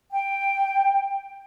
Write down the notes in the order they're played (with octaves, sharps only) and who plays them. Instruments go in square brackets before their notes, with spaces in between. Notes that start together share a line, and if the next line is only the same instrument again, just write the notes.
[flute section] G5